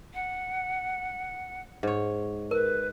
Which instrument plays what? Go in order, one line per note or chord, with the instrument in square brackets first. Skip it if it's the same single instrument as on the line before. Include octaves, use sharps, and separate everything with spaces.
[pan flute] F#5
[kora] G#2 C#5
[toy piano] A#4 [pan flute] B4